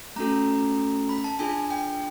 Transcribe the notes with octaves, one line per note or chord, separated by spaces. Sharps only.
A3 C#4 F#4 A4 A#5
B5
A5
D4 F4 G#4 G#5
G5